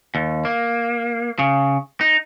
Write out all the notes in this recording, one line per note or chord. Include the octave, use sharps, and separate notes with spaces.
D#2
A#3
C#3
D#4